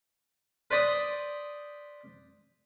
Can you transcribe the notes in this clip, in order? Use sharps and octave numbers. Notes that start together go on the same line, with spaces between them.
B4 C5 D5 B5 D#6